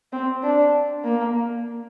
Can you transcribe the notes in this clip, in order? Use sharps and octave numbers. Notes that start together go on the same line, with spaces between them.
C4
D4
A#3